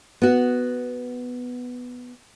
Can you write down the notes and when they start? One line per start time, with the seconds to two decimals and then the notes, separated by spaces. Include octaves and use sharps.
0.22 B3 F#4